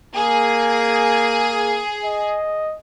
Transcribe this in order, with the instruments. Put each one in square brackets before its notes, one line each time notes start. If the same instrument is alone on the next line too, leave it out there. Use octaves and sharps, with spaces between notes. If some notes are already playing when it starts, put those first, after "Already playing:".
[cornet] A#3 [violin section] G#4
[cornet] D#5